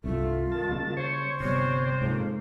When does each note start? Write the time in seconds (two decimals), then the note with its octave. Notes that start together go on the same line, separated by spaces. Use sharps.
0.04 C2 G2 A3 F4
0.52 D#3 A5
0.69 C#3 G3 A#3
0.97 C5 C#5
1.40 G1 C3 G3 C#5
2.01 F2 G#2 F3 A#3